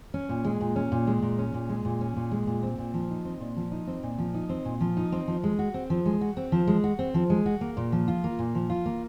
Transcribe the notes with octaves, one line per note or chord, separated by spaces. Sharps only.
C#4
A#2
G#3
A#2
C#4
A#2
G#3
A#2
C#4
A#2
G#3
A#2
C#4
A#2
G#3
A#2
C4
A#2
F3
D#4
C4
A#2
F3
D#4
C4
A#2
F3
D#4
C4
A#2
F3
D#4
C4
F3
G#3
F#4
C4
F3
G#3
F#4
C4
F3
G#3
F#4
C4
F3
G#3
F#4
A#3
A#2
F3
F4
A#3
A#2
F3
F4
A#3